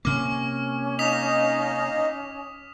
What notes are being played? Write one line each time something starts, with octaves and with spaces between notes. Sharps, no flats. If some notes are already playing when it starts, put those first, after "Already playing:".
C3 A#3 C#4 D6 F6
D#4 D#5 F5 D#6 B6 F7